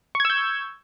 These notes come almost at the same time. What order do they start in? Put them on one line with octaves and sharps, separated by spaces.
C#6 G#6 E6 G6